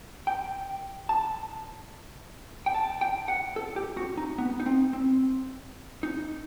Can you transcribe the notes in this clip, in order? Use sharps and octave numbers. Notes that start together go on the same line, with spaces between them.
G5
A5
G5
A5
G5
F#5
A4
G4
F#4
D#4
B3
D#4
C4
C4
D#4